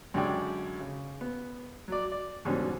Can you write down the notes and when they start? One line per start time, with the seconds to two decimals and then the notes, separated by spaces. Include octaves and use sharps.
0.14 F#2 D3 G#3 G4 D5 G5
0.80 C#3
1.21 B3
1.88 F#3 D5
2.12 D5
2.45 E2 G#2 B2 D3 G3 C#4